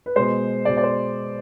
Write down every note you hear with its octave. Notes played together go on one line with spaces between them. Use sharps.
B4
B2 G#3 C5
B2 G#3 D5
D5
C5